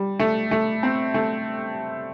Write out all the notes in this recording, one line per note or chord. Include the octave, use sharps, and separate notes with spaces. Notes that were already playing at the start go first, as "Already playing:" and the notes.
Already playing: G3
A3
A3
C4
A3